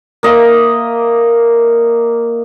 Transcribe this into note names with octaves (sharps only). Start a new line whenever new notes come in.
A#3 D#5 E5 D6